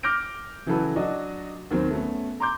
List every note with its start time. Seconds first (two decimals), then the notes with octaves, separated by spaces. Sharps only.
0.03 D6 F6 G6 A#6 D7
0.66 C#3 E3 F#3 F#4 A4 B4
0.96 F#3 D4 F#4 D#5
1.71 D#2 D#3 F#3 C4
1.91 A3 B3 C#4
2.40 A#5 C6 D6 G6